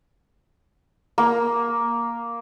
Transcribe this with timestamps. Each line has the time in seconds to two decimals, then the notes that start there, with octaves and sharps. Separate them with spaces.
1.18 A#3